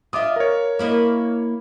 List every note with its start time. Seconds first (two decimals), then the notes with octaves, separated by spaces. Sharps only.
0.13 F4 D#5 E5 D6 D#6
0.36 A#4 C#5
0.79 A#3 E4 D#5